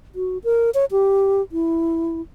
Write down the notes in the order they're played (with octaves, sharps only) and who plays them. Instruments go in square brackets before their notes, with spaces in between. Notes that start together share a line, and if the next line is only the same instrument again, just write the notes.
[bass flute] F#4
A#4
C#5
G4
E4